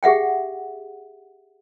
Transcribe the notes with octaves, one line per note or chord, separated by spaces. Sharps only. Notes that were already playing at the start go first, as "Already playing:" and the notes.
G4 G#4 E5 F#5 G5